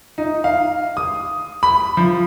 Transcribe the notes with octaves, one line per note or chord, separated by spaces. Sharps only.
D#4
F5
D#6
B5
F3